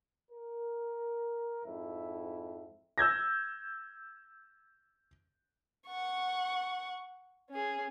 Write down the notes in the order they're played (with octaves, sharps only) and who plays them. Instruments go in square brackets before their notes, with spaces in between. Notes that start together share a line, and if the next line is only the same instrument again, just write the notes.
[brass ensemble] A#4
F2 G#2 E4 E5
[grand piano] E6 G6 G#6 A#6
[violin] F#5 C#6
C#4 G#4